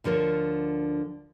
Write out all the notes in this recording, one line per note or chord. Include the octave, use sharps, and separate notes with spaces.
D2 D3 F3 A#4 C#5